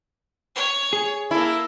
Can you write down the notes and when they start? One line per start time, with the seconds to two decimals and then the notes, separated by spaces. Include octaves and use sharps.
0.56 C#5
0.93 G#4
1.31 A#3 E4 A4